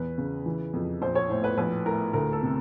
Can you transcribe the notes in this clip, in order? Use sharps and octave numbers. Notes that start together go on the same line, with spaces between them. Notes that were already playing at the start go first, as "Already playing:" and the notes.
Already playing: E2 B4
C#3
E3
F2
A#1 C5
C#5
A2 C5
B4
A#1 B4
A2 A#4
D2 A#4
A4
C3